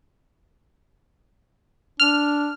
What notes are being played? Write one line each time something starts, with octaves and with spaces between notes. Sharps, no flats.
D4 F6